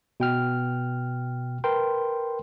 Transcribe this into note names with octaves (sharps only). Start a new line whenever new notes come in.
B2 G5 F6
A#4 B4 G5 C6